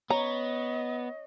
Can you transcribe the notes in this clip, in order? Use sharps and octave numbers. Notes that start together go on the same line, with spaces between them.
B3 C#5 D#5 A#5